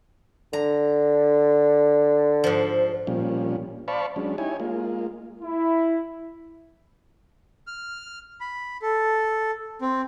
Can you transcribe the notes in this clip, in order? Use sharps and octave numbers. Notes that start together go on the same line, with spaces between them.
D3 A#5
G#2 F3
A#2 F3 G3 C#4
C5 D5 F5 A5 B5 C#6
F#3 G#3 C#4 D4
D#4 E4 G4 C#5 G#5
G#3 A#3 F4
E4
F6
B5
A4
C4